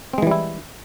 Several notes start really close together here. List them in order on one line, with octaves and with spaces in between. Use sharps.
C4 G#3 E3 G3 E4